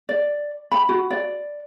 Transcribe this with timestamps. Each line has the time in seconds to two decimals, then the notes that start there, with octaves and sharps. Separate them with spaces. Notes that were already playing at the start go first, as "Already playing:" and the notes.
0.09 D5
0.72 B5
0.89 F#4
1.10 D5